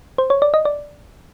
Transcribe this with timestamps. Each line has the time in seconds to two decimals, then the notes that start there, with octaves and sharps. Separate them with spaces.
0.18 C5
0.30 C#5
0.42 D5
0.54 D#5
0.65 D5